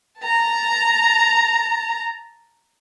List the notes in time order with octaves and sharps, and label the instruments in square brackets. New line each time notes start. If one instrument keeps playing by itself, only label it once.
[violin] A5 A#5